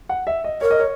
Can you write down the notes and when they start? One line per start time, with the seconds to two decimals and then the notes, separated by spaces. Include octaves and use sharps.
0.09 F#5
0.27 E5
0.44 D#5
0.61 A#4 C#5
0.71 D#5
0.80 C#5